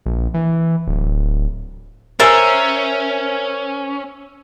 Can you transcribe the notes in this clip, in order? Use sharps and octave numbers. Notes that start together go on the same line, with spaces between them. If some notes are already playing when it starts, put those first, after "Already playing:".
A#1
E3
D1
C#4 A#4 C5 E5 G#5 E6 A6